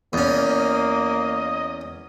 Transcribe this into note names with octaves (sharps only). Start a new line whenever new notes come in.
E2 A#3 C#4 D#5